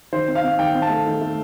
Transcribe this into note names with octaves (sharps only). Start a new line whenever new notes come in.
D#3 C5
C4
F5
C4
D#3 G5
C4
A5
A3
D#3
A3